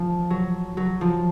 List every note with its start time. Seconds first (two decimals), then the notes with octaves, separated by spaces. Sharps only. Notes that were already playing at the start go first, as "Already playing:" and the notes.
Already playing: F3
0.30 F#3
0.77 F#3
1.01 F3